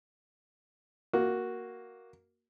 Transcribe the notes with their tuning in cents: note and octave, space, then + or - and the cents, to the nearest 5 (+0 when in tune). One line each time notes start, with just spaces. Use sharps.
A#3 +0 F#4 +0